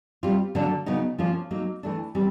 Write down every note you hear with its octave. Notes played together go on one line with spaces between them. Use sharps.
G3 C4 F4
D3 F#3 A#3 D4
C#3 F#3 B3 D#4
F3 A#3 C#4 F4
F#3 A#3 D#4
E3 A3 D4
E3 G3 C4